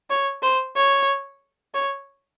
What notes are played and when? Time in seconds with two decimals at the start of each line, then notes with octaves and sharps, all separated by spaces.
0.10 C#5
0.43 C5
0.76 C#5
1.74 C#5